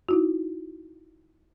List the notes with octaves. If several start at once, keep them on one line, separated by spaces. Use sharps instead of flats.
D#4 E4 F#4